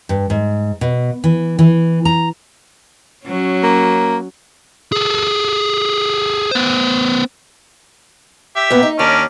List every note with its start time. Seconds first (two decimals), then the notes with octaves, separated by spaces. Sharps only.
0.09 G2
0.30 G#2
0.81 B2
1.24 E3
1.59 E3
2.05 A#5
3.26 F#3 C#4
3.63 A#3
4.92 G#4 A4
6.51 B3 C5
8.56 G4 E5
8.71 A#2 B3
8.83 D#4
8.99 D#2 C#4 D4 A#4